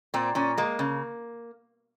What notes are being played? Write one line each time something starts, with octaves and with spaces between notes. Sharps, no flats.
A#2 C4
A#2 C#4
G#3 A#3
C#3